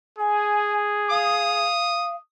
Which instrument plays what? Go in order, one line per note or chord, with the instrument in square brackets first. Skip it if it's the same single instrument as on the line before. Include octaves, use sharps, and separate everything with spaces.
[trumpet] G#4 [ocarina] G#5
[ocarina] F5 [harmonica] D#6